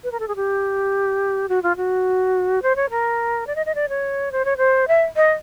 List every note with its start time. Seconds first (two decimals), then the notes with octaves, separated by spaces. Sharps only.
0.04 B4
0.12 A#4
0.20 A4
0.28 G#4
0.36 G4
1.49 F#4
1.63 F4
1.76 F#4
2.62 C5
2.76 C#5
2.90 A#4
3.47 D5
3.55 D#5
3.66 D#5
3.75 D5
3.89 C#5
4.32 C5
4.45 C#5
4.57 C5
4.88 E5
5.16 D#5